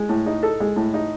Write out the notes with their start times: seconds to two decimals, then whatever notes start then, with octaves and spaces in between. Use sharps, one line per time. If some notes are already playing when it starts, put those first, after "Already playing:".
Already playing: G#3
0.09 A2
0.26 D#4
0.43 A4
0.60 G#3
0.76 A2
0.94 D#4